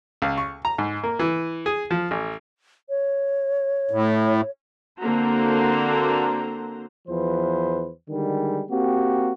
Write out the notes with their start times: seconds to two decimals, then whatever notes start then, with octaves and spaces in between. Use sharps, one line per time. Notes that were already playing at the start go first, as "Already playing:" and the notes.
0.22 C#2
0.38 C#6
0.65 A#5
0.78 G#2
1.03 A#3
1.19 E3
1.66 G#4
1.91 F3
2.11 A1
2.89 C#5
3.91 A2
5.00 D3 A#3 C4 F#4 C5 A#5
7.08 E2 F3 B4 C5
8.09 D3 D#3 G3 G#3
8.70 A#3 C4 F#4 G4